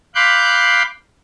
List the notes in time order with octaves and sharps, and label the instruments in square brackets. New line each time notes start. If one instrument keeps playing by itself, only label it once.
[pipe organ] F5 B5 C6 D6 F#6 G6